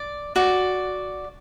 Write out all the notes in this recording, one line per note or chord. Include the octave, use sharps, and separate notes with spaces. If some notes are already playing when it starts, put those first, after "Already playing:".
Already playing: D5
F#4 D5